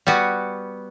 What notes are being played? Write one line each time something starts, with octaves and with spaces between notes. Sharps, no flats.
G3 B3 F#4